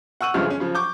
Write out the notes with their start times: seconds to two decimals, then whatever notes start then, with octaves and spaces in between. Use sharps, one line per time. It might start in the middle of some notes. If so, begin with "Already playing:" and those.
0.21 F#5 C#6 E6 D#7 F#7
0.34 G1 G2 C#3 F3 G#3 F6
0.46 C#4 G#4
0.60 C#3 F3
0.75 C#6 D6 G6